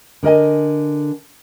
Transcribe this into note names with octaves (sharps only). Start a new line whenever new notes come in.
D3 A#4 D#5 G#5